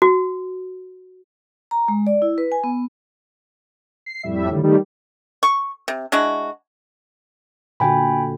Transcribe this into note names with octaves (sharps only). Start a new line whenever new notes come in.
F#4
A#5
G#3
D5
E4
B4
G#5
B3
C7
F2 A2 G3 E5
A2 D3 D#3 G3
D#3 G3 A3 G4
C#6
C3
G#3 D4 E4 F#4
A#2 D3 F#4 G5 G#5 B5